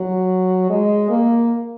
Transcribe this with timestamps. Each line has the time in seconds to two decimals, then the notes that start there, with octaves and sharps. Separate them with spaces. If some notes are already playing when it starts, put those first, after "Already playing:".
Already playing: F#3
0.70 G#3
1.10 A#3